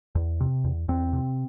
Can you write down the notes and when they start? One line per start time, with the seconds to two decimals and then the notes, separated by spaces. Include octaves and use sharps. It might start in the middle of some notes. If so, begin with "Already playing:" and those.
0.15 E2
0.40 C3
0.64 E2
0.88 E2 C4
1.13 C3